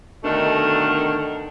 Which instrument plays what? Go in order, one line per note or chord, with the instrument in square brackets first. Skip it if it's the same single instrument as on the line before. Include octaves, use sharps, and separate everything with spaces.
[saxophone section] B2 D3 D#3 A3 D4 A#4